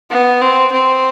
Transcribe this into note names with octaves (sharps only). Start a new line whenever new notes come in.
B3
C4
C4